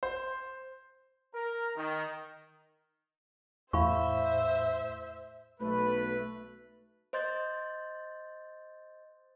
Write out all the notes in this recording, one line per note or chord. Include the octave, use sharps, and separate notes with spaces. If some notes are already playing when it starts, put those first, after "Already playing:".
C5
A#4
D#3
E2 A2 C5 E5 F5 B5 C#6
B1 A3 B4
C5 D#5 C6 G6 A6